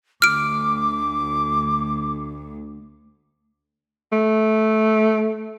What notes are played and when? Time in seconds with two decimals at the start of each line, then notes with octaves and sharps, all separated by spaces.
0.22 D2 D6 F6 D7
4.12 A3